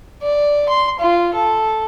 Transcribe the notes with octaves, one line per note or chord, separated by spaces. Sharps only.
D5
C6
F4
A4